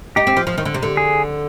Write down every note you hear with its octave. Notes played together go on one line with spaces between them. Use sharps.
D#4 G4
C4
F3
F3
D#3
D3
C3
D3
G#4